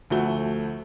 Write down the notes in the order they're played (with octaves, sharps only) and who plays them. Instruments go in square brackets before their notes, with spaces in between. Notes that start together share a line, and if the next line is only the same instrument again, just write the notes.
[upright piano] D2 F3 A3 F#4 G7